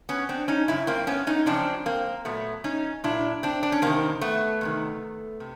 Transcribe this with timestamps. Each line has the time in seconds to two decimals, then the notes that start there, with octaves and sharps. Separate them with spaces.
0.09 B3 C#4
0.29 C4 D4
0.48 C#4 D#4
0.68 F#2 C#3 E4
0.87 A#3 C4
1.07 B3 C#4
1.27 C#4 D#4
1.46 F#2 C#3 F3 C4 D4
1.86 A#3 C4
2.25 A#2 F#3 A3 B3
2.64 C#4 D#4
3.04 A#2 F#3 D4 E4
3.43 C4 D4
3.63 D4
3.72 C#4
3.82 E2 C3 D#3 A#3 C4
4.21 A3 B3
4.61 E2 C3 D#3
5.40 C3